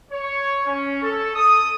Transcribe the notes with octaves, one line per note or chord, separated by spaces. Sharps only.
C#5
C#4
A4
D#6